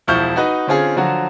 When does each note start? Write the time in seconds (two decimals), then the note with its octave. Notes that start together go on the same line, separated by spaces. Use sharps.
0.07 E1 F3 E4 C#6 F6 G6
0.36 D#4 F#4 B4 D#5
0.67 D3 C4 C#4 F4 G#4
0.96 D3 F3 F#3 F#4